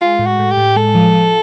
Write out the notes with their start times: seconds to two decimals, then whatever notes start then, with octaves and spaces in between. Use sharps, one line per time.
0.01 G#3 F4
0.19 A2
0.26 F#4
0.39 A2
0.51 G4
0.57 A2
0.76 G#3 A4
0.95 F3
1.14 F3